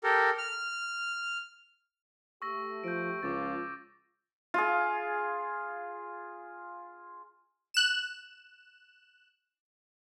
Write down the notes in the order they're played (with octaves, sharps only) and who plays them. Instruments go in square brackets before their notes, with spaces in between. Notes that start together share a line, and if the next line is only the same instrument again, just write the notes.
[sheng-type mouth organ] G4 A4 A#4
F6
[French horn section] A3 G4 [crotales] C#6 E6 A#6
[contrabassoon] F3 [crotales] G6 D7
[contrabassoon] C#2 [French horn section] F3 F4 [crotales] D6 A6
[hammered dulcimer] F4 [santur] G#4 F5
[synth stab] F#6 E7